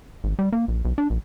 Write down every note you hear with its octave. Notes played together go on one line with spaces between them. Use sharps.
G#1
G3
A#3
A#1
B1
D4
A#1